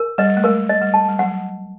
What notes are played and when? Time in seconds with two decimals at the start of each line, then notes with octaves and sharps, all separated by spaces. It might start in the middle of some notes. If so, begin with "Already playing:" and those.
Already playing: A#4
0.18 G3 D#5
0.37 A3
0.44 G#3 A#4
0.69 D#5
0.81 G3
0.94 A5
1.08 G3
1.19 F#3 F#5